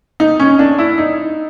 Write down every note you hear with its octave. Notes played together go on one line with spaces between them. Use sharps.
D#4
C#4
D4
E4
D#4